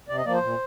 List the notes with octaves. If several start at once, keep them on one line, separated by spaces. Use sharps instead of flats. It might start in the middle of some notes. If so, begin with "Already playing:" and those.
C3 D5
D#5
F3 A#3 D5
C5
A#2